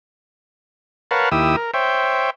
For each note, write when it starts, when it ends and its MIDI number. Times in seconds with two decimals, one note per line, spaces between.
1.11 1.29 70
1.11 1.29 71
1.11 1.29 73
1.11 1.29 77
1.11 1.29 78
1.11 1.29 81
1.32 1.56 39
1.32 1.56 64
1.32 1.56 67
1.32 1.56 87
1.32 1.56 88
1.56 1.71 70
1.74 2.30 72
1.74 2.30 73
1.74 2.30 76
1.74 2.30 79